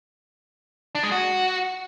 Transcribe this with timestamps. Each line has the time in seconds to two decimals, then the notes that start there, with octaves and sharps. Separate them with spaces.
0.95 D4
1.03 G#3
1.12 F#4